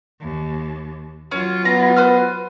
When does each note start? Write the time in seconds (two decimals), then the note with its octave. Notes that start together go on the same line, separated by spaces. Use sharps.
0.21 D#2
1.31 F#3 C#4 F4
1.65 B3 A#5
1.96 B4 C5 F6